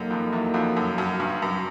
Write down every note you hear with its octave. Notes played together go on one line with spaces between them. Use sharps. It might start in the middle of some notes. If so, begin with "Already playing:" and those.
Already playing: F#2 F#3 A#3 D#4 F#4 A4
F2
E2
F2
F#2
F#2
G2
F#2